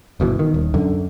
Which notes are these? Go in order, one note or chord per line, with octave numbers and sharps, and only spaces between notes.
G1 B2 D#3 E3
D#3
D#1
F#2 D3